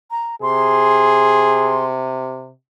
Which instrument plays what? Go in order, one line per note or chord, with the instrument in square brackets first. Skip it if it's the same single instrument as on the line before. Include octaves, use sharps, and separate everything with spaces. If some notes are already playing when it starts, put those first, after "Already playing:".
[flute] A#5
[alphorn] C3 [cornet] G#4 [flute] C6